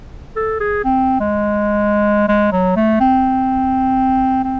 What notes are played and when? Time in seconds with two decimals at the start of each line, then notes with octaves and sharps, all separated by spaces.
0.36 A4
0.60 G#4
0.84 C4
1.20 G#3
2.28 G#3
2.52 F#3
2.76 A3
3.00 C4
4.44 C4